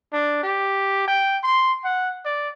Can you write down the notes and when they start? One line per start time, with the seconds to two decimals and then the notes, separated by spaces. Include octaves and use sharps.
0.12 D4
0.43 G4
1.07 G5
1.43 C6
1.84 F#5
2.25 D5